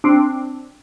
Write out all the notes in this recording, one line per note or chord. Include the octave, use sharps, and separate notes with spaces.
C4 D4